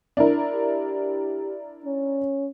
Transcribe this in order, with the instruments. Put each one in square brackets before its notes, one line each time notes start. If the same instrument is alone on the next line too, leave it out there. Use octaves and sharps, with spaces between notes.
[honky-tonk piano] D4 E4 A#4
[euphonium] G4
C#4